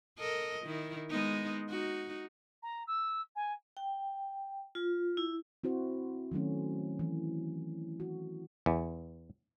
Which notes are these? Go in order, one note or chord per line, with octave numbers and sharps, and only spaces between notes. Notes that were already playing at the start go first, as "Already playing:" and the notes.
A4 A#4 D#5
D#3 E4
G#3 B3 D#4
D#4 F#4
A#5
E6
G#5
G5
F4
E4
C4 E4 F#4 C5
D#3 F#3 A3 C#4
E3
F#4
E2